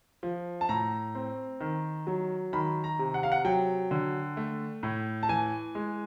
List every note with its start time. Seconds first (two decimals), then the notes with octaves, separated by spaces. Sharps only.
0.23 F3
0.61 A5
0.69 A2 A#5
1.15 C4
1.61 D#3
2.07 F#3
2.53 D#3 B5
2.84 A#5
2.99 C3
3.14 F#5
3.23 F5
3.32 F#5
3.45 F#3 G5
3.91 D3
4.37 A3
4.83 A2
5.23 A5
5.29 E3 G#5
5.75 G#3